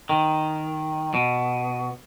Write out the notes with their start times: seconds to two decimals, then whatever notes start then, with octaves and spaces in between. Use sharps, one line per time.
0.09 D#3
1.14 B2